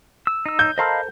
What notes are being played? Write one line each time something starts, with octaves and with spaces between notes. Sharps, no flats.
E6
D#4 E6
G6
A4 A#4 C5 D#5 F5 B5